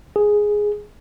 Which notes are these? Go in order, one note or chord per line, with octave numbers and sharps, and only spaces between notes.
G#4